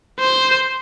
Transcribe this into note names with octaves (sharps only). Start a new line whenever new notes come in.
C5